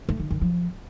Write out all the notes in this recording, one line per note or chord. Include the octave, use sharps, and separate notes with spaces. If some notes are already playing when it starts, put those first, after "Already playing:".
A3
D#3
D#3
F3